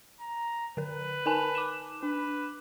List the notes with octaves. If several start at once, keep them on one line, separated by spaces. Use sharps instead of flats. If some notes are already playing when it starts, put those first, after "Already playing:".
A#5
D3 A#4 B4
D#4 A#4 G#5 A5
D6 E7
D4 B4